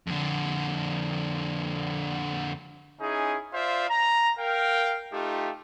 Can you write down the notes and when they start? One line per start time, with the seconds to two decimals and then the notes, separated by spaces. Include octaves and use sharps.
0.07 F2 D3
3.01 C#4 D#4 E4 G#4
3.54 F4 C5 D5 E5 F5
3.89 A#5
4.39 A#4 F5 G5
5.13 A3 D#4 F4 G4